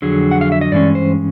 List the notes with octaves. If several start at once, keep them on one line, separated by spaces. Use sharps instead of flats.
F2 D3 F#3 G#4
F#5
F5
E5
D#5
G2 E3 G#3 C#4 D5
C5